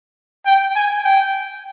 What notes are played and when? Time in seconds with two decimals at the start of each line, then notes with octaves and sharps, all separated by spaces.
0.46 G5
0.76 G#5
1.05 G5